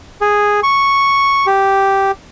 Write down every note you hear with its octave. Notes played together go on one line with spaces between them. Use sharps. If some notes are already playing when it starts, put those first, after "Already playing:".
G#4
C#6
G4